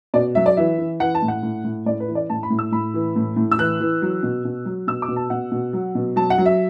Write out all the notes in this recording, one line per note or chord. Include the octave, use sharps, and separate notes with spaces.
B2 D5
F#3 E5
D5
E3 E5
E3
E3 F#5
A5
A2
F#5
A2
A2
A2 D5
B4
E3
D5
A2 A5
B5
A2
E6
A2 B5
E3
A2
A2
E6
E3 F#6
E3
F#3
B2
B2
F#3
B2 E6
D6
B2
A5
B2 F#5
B2
F#3
B2
F#3 A5
F#5
F#3
E5